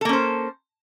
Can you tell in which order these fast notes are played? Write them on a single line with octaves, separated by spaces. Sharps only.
A4 A#3 C#4 C5